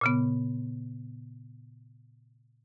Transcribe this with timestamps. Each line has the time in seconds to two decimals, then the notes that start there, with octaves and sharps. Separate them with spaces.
0.01 A#2 C#3 B3